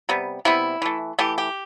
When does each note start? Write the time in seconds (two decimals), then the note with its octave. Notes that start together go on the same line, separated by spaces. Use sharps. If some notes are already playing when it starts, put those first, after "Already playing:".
0.09 C3 G3 B3
0.45 C3 G3 B3 E4
0.82 E3 A3
1.18 E3 A3 G4
1.38 G4